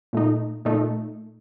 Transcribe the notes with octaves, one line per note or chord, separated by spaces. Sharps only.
A#2 A3 D#4
A#2 A3 D#4